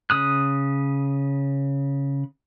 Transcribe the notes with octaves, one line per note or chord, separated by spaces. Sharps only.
C#3 D#6 F#6